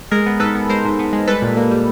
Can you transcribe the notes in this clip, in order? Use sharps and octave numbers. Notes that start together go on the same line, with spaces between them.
G#3 G#4 A#4
B3
G#2 A4 B4
B3
G#3 A#4 C5
G#2
B3
G#3
G3 A4 B4
A#2
A#3
G3